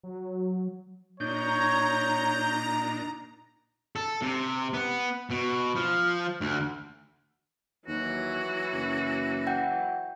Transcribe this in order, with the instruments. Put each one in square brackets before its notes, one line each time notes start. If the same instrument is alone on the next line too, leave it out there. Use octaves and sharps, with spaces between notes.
[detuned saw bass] F#3
[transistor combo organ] A#2 D4 D#4 [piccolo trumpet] C#5 [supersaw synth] A#5 [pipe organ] G6
[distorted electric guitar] A4
C3
B3
B2
F3
D2
[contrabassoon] D#2 [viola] E3 F#3 [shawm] F#4
[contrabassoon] F#1
[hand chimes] F#5 G5 G6